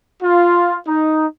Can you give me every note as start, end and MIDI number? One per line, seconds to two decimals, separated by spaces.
0.22 0.77 65
0.86 1.24 63